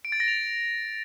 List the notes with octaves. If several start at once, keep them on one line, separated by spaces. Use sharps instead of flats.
D7
A6
A#6
F7